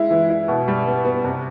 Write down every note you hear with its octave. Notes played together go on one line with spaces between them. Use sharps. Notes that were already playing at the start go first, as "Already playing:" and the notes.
Already playing: G#3 E4
E3
E4
B2
G3
B3
B3
C3